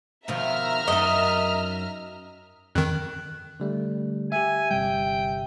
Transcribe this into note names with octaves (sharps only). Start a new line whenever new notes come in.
B2 D#3 F3 E5 A#5 F6
F#2 D#4 D#5
F2 D#3 F#6
D3 G3 A3
G4 E5 G#5
G1 C3 G3 G5